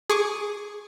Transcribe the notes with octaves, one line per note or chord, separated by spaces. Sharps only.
G#4 C#6 D6